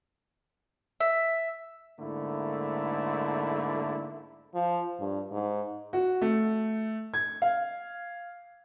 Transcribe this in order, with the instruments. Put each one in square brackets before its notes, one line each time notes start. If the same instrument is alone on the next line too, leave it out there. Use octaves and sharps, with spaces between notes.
[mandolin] E5
[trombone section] G#2 D3 A3 A#3 E4
[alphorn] F3
G2
G#2
[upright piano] F#4
A3
G#6
F5